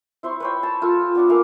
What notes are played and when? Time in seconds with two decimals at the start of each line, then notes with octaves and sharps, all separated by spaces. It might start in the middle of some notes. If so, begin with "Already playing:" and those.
0.23 E4 C5 C6 C#6
0.40 B4 C#5 G5
0.63 A5
0.82 F4 A4
1.15 B3 D4 F#5
1.29 A#3 A4 F5 G#5